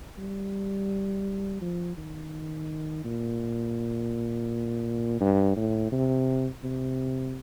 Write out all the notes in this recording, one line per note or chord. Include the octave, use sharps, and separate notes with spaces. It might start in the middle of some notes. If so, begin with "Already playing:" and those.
G3
F3
D#3
A#2
G2
A2
C3
C3